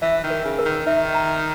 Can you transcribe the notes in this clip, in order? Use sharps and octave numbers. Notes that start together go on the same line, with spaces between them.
E3 E5
D#3
A#4
C#3
A#4
D#3
D#3 E5
A#5